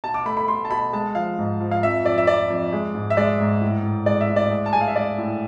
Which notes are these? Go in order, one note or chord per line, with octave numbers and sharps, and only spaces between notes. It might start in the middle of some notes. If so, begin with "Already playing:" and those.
B2 A5
D6
A3 B5
B5
A3 C6
A5
B2 B5
G#3 A5
F3 F5
G#2
F3
F5
F2 E5
F2 D5
E5
F2 D5
F2
G#3
G#2
E5
G#3 D5
G#2
A2
A2
G#3 D5
E5
A2
D5
G#3
A5
G#3 G#5
F5
E5
G#3 D5
A2